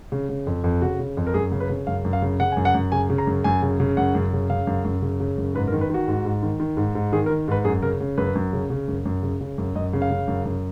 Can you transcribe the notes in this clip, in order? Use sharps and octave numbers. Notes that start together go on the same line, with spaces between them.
C#3
C#3
F2
F2
C#3 F#4
C#3
F2
A#4
F#2 G#4
C#3
B4
C#3
F#2 F5
F#2
F5
C#3
C#3 F#5
F#2 G#5
F#5
F#2
C#3 G#5
C#3
A#5
F#2
F#2 G#5
C#3
C#3
F#2 F#5
F#2
C#3
C#3 F5
F#2
F#2
C#3
C#3
F#2
G#2 B4
A#4
D#3
B4
D#3 F#4
G#2
G#2
D#3
D#3
G#2
G#2
D#3 G#4
A#4
D#3
G#2 B4
F#2 G#4
C#3 A#4
C#3
F#2 B4
F#2
C#3
C#3
F#2
F#2
C#3
C#3
F#2
F#2 D#5
C#3
F5
C#3
F#2
F#2